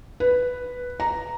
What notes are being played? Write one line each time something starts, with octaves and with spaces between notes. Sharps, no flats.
B4
A#5